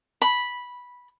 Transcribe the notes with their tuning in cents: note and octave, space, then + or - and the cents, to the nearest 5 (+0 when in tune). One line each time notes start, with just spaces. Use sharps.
B5 -10